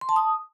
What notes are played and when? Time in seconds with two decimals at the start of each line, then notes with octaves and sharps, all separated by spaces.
0.01 C6
0.09 A5
0.16 D#6